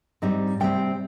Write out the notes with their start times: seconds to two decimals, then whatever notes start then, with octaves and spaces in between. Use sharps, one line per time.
0.22 G#2 G3 C4 D#4
0.60 C3 G3 C4 G5